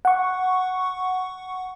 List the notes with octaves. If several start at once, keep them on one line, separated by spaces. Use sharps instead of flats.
F#5 C#6